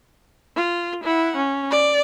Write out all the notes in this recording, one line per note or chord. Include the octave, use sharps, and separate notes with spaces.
F4
E4 F#5
C#4
D5